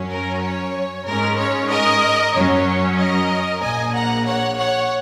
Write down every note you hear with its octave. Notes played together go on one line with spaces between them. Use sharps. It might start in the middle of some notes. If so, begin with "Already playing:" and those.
Already playing: F#2 F#3 C#4
A#4
C#5
G#2 G#3 C#4 A#4
C#5
A#4 D#5
F#2 F#3 C#4 C#5
A#4 D#5
A#1 A#2 A#3 D#5 G#5
F#5 A#5
C#5 F#5
C#5 F#5